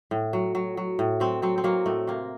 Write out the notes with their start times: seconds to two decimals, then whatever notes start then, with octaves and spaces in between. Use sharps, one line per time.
0.11 A2
0.33 F#3
0.55 F#3
0.77 F#3
0.99 A2
1.20 F#3 C4
1.42 F#3 C4
1.58 C4
1.64 F#3 A#3
1.86 A2 A3
2.07 C3 A#3